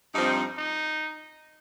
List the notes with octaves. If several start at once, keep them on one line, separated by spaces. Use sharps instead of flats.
G2 F3 C4 D#4
D#4